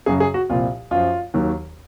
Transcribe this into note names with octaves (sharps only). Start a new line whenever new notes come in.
F#2 C#3 F#3 G#4
G#4
F#4
C2 A#2 F3 F4
F#2 F3 F4
D#2 D#3 F#3